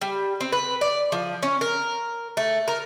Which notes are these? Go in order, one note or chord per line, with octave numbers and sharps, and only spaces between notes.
G3
C4
B4
D5
F3
C#4
A#4
A3
A#4